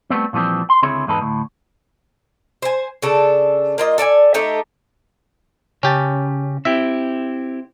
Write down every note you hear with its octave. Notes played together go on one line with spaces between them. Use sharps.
G3 A3 B3 C4
A#2 E3 F3 G3 C4
C6
C#2 D3 C4 E4 G#4 C#5
E2 G#2 G#3 D#4 A4 B4
D2 A2
C5 G#5
C#3 D4 A4
A#3 F4 D#5
A4 D5 E5 G#5
A3 D#4 G4 A4
C#3 C#4 G4 A5
C4 E4 G4 E5